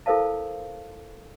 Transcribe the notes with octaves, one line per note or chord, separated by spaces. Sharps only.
E4 A4 A#4 C5 F5 A5